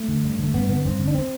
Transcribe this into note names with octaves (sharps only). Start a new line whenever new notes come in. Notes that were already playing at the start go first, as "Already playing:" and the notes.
Already playing: A3
D3
G2
D3
A3
G2 B3
D3 B3
G2 C4
D3
D4
C4